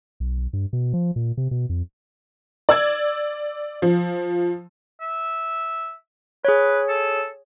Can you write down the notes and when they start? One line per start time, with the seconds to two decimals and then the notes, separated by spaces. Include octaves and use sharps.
0.20 B1
0.38 B1
0.53 G2
0.73 B2
0.93 F3
1.16 A#2
1.37 C3
1.51 B2
1.69 F2
2.69 D5 E6 G#6
3.82 F3
5.01 E5
6.45 G#4 B4 C#5
6.89 A4